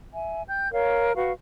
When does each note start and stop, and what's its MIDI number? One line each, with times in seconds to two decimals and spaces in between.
0.13 0.42 76
0.13 0.42 80
0.49 0.70 79
0.49 0.70 91
0.72 1.14 70
0.72 1.14 73
0.72 1.14 77
1.15 1.32 66
1.15 1.32 71
1.15 1.32 77
1.15 1.32 85